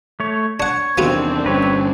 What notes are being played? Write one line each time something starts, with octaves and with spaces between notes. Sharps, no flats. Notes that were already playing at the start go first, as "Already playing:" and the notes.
A3 C#5
D4 C#5 F#5
E2 C3 D#3 B3 C4 D4 F4 F#4
G1 G3 C#4 B4 C#5